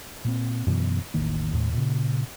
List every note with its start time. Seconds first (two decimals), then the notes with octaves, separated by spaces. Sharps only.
0.25 A#2 A#3 C4
0.66 F#2 B2 E3 B3
1.14 E1 A1 D#3 A#3
1.53 D#2 A2
1.73 A#2 C#3